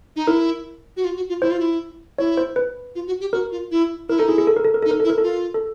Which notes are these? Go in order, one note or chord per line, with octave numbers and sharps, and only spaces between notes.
D#4
E4 A#4
F#4
F4
F#4
F4
E4 C5
F4
E4
E4 C#5
C5
B4
F4
F#4
G4
F#4 A#4
F4
E4
E4 A#4
D#4 A4
E4 G#4
G#4
A4
A#4
A4
A#4
D#4 A4
A#4
A4
E4
A#4
A4
F4
A4